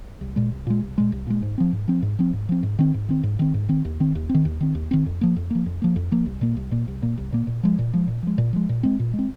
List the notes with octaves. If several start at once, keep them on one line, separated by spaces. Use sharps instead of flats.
C2
A#2 G#3
C2
A#2 G#3
C2
A#2 G#3
C2
A#2 G#3
G#2
F3 C4
G#2
F3 C4
G#2
F3 C4
G#2
F3 C4
G#2
D#3 C4
G#2
D#3 C4
G#2
D#3 C4
G#2
D#3 C4
D#2
D#3 C4
D#2
C4
D#3
D#2
D#3 C4
D#2
D#3 C4
F2
F3 A#3
F2
F3 A#3
F2
F3 A#3
F2
F3 A#3
C2
A#2 A#3
C2
A#2 A#3
C2
A#2 A#3
C2
A#2 A#3
A#2
F3 G#3
A#2
F3 G#3
A#2
F3 G#3
A#2
F3 G#3
A#2
G#3 C4
A#2
G#3
C4